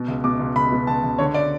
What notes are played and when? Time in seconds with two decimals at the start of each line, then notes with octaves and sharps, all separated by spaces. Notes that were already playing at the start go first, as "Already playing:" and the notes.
Already playing: B2
0.08 C#2
0.24 B2 D6
0.40 C#2
0.56 C#2 B5
0.72 B2
0.87 C#2 A5
1.04 C#2
1.19 D3 C#5
1.34 D5